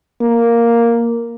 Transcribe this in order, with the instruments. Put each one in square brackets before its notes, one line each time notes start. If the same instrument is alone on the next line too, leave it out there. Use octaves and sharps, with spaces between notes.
[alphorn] A#3